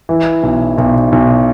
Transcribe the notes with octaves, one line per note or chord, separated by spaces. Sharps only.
E3
B1
B1
B1